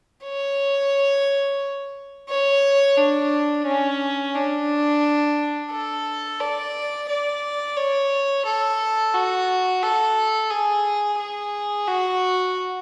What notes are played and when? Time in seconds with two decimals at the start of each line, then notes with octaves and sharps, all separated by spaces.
0.25 C#5
2.30 C#5
2.98 D4
3.66 C#4
4.35 D4
5.72 A4
6.40 D5
7.09 D5
7.77 C#5
8.45 A4
9.14 F#4
9.82 A4
10.50 G#4
11.18 G#4
11.87 F#4